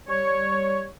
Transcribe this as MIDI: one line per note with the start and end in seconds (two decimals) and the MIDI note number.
0.08 0.85 55
0.08 0.85 73